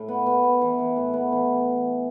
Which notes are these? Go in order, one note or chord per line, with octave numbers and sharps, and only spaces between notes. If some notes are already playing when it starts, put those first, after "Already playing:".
Already playing: A2
B3
B3
B3
E3
E3
A2
B3
E3